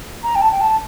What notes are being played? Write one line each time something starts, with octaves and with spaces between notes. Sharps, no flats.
A#5
G5
A5
G5
A5